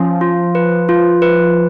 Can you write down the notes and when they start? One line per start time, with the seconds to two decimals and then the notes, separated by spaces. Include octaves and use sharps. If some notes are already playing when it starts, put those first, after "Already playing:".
Already playing: F3 C#4
0.21 F4
0.55 B4
0.89 F4
1.22 B4